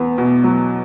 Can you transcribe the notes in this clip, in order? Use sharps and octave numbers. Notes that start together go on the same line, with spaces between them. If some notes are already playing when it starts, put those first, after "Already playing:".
Already playing: E2 B3
B2
F#3